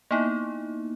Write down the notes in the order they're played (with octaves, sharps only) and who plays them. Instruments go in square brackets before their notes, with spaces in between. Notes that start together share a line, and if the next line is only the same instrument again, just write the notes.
[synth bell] A#3 B3 D#4 E4